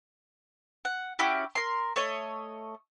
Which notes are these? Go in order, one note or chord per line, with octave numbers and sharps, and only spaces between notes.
F#5
C#4 E4 F#4 G4
A#4 C6
A3 C#5 D#5